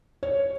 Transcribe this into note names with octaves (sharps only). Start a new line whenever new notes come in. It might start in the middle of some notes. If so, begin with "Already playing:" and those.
C#5